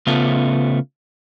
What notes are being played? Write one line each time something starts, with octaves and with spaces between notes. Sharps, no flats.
C#3 A3 B3 F4